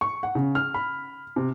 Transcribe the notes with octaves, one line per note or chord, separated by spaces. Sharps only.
C#6
F#5
C#3
F6
B5
C3